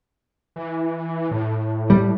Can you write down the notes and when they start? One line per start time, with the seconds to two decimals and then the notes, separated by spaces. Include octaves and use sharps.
0.56 E3
1.31 A2
1.90 G3